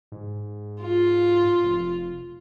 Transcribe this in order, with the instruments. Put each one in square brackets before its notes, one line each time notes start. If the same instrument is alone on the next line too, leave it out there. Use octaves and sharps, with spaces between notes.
[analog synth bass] G#2
[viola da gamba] F4
[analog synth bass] F1